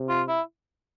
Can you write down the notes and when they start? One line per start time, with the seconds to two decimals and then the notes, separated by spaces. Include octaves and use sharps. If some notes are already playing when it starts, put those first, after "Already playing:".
Already playing: C3
0.09 F4
0.28 E4